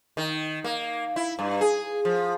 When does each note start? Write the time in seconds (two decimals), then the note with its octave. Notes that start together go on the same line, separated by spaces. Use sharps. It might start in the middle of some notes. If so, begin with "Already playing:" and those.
0.17 D#3
0.64 A#3
1.16 E4
1.39 G2
1.61 G#4
2.05 F3